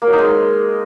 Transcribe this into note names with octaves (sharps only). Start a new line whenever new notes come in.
A#3
F#3
D#4
G#3